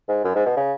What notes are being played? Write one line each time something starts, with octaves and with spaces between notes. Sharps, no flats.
G#2
F#2
G#2
B2
C#3